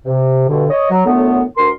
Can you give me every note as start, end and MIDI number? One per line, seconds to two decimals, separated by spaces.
0.06 0.45 48
0.47 0.66 43
0.47 0.66 47
0.47 0.66 50
0.70 0.86 73
0.70 0.86 75
0.90 1.04 54
1.06 1.43 42
1.06 1.43 45
1.06 1.43 50
1.06 1.43 57
1.06 1.43 59
1.57 1.70 38
1.57 1.70 70
1.57 1.70 84